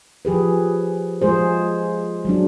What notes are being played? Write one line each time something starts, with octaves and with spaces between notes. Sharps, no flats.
F3 G4 G#4 B4
F3 G#3 F4 G#4 C5
F#3 G#3 D4